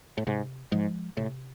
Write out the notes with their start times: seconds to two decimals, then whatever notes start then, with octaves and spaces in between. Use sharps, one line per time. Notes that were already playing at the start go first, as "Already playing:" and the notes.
0.18 A2
0.27 G#2 C3
0.72 G#2 F3 G#3
1.17 A2 C3